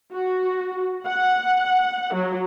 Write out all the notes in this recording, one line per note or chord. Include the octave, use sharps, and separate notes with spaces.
F#4
F#5
F#3